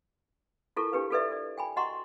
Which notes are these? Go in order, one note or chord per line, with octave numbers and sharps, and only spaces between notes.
E4 F4 A4 A#4 A5 C#6
D4 G4 B4 F5
F4 G4 A4 B4 D5 E5
A4 D5
G5 G#5 B5
F#4 D#5 F#5 A#5 C6 C#6